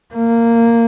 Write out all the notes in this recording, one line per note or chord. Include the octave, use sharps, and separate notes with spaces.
A#3